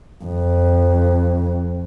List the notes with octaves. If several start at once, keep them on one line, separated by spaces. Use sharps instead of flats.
F2